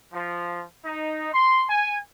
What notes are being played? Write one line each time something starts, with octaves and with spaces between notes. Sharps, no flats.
F3
D#4
C6
G#5